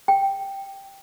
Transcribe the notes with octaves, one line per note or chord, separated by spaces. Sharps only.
G5